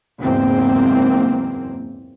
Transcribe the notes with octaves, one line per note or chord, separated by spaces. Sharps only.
F#1 E2 G#2 A#3 C4